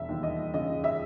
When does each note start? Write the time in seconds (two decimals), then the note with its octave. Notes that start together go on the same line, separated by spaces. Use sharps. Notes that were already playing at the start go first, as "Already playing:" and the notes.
Already playing: E1 E5
0.09 D#2
0.23 D#5
0.54 C#3 D#5
0.84 E5